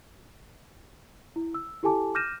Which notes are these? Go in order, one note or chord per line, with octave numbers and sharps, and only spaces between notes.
E4
E6
E4 G4 A4 G#5 A5 D6
D6 F6 G6 A#6 D#7 E7